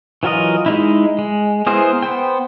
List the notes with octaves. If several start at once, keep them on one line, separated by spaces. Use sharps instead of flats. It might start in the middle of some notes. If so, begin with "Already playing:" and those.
E3 F#3 F4 A#4 D#5
G#3 D#4 E4
G#3
B3 E4 G#4 A#4 C5
B3 C5 G5